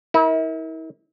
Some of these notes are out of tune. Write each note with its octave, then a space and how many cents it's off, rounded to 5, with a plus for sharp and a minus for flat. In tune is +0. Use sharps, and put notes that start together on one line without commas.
E4 -40 A#4 +5